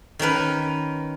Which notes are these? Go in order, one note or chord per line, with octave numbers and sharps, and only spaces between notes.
D#3 C#4 A#4 B4